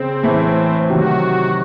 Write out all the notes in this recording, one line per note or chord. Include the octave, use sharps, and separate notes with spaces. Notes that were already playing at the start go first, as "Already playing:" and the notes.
Already playing: C#3 C4
A2 E3 A3
C3 D#3 F#3 F#4